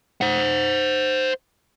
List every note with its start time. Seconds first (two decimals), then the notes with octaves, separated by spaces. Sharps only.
0.21 C5 F#5